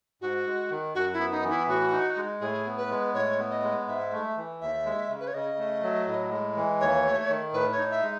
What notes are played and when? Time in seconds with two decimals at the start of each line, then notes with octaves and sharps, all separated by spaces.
0.21 G#2 F#4
0.46 G#3
0.71 D#3
0.95 F#2 F#4
1.13 E4
1.19 B3
1.32 D#4
1.43 E3
1.50 E4
1.68 A2 F#4
1.92 D#4
2.17 G#3
2.41 A2 G#4
2.66 B3
2.78 B4
2.90 G#3
3.14 A2 C#5
3.39 B3
3.51 D#5
3.63 G#3
3.88 G#2 E5
4.12 A3
4.37 E3
4.61 D#2 E5
4.85 G#3
5.10 C#3
5.20 B4
5.27 C#5
5.34 C#3 D#5
5.58 A3
5.83 F#3
6.07 A2
6.31 G#3
6.56 E3
6.80 D#2 C#5
7.05 A3
7.29 D#3
7.53 A2 B4
7.72 C#5
7.78 D#4
7.91 E5
8.02 G#3